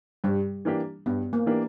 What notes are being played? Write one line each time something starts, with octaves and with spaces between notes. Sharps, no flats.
G2 G3
E3 A#3 D4 G4
G2 B3
A#3
E3 A#3 D4 G4